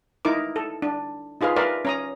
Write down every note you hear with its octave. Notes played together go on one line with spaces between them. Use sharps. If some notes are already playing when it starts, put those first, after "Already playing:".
D#4 E4 A#4 D6
A4
D4
D#4 F4 G#4 B4 F5
A#4 B4 D5 E5 F5
C#4 A#5 D#6